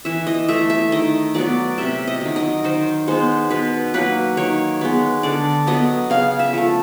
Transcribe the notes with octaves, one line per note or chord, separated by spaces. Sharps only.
E3 E5
D#5
A3 E5
E5
D#3 D#5
F#3 B3 D5
C3 E5
D#5
D#3 F#3
D#5
D#3 C5
G#3 B3 C5
B2 B4
F#3 A#3 B4
D#3 C#5
G#3 B3
D3 D5
F#3 B3 D#5
C#3 F5
E5
F3 A3